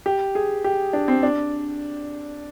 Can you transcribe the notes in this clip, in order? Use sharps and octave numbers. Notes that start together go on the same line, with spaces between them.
G4
G#4
G4
D4
C4
D4